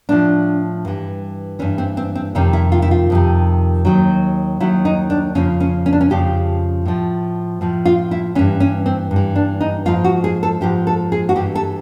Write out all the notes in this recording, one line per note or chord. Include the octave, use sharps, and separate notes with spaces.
A2 F3 D4
G2 E3
G2 E3 C#4
C4
C4
C4
F2 C3 D#3 C#4
E4
F4
E4
F4
F2 C3 D#3
D#2 D#3 F#3
D#2 D#3 F#3 E4
D#4
D4
F2 C#3 F3 C#4
C#4
C#4
D4
C#4
F2 C#3 F3 G4
A2 F3
A2 F3
F4
E4
G2 E3 C#4
C#4
C4
G2
E3
D4
D#4
G#2 F3 F4
F#4
G#4
A4
G#2 F3 G4
A4
G#4
F#4
G2 E3 G4
A4